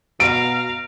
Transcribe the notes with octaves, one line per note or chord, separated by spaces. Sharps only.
B2 F5 A#5 D7